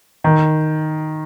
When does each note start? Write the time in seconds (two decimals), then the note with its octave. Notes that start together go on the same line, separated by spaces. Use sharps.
0.24 D#3